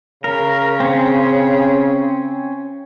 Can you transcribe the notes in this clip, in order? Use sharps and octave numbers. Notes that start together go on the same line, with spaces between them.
C#3 A#4
C4 C#4